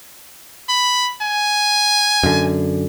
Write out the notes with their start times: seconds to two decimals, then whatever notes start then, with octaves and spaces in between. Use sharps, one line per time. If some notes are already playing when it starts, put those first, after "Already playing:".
0.69 B5
1.22 G#5
2.23 F#2 D3